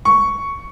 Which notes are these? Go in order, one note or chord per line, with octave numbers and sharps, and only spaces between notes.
C#6